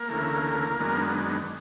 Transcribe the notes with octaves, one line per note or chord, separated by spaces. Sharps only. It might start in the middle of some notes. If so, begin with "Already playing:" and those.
Already playing: A#3 A#4
D2 C#3 E3 A3
F#2 D#3 G#3 B3 D4